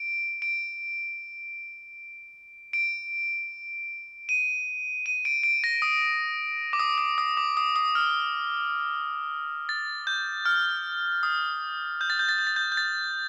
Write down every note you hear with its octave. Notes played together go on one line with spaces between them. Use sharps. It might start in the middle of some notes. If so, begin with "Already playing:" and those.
Already playing: D7
D7
D7
D#7
D#7
D7
D7
A#6
D#6
D6
D#6
D#6
D#6
D6
D#6
D#6
F6
A6
G6
F6
D#6
G6
A6
G6
A6
G6
A6
G6
G6
A6